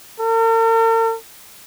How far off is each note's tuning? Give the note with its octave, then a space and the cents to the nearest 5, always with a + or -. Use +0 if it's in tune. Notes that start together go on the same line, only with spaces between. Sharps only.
A#4 -45